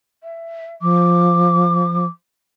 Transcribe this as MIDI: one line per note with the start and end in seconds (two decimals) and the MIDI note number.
0.23 0.71 76
0.82 2.06 53
0.82 2.04 86